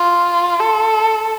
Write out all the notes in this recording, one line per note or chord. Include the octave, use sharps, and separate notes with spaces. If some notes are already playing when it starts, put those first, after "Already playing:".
Already playing: F4
A4